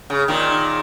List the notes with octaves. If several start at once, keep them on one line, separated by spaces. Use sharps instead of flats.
C#3
A#2 D#3